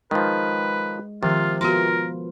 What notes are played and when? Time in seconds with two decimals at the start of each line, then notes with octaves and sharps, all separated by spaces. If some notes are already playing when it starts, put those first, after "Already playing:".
0.11 D#3 F3 G#3 B4
1.23 C3 D#3 F3 F4 A#4
1.61 B3 F4 F#4 A#4 C6